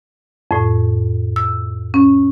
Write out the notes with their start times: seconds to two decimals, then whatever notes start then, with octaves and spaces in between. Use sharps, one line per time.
0.51 F2 A2
1.36 E6
1.94 C#4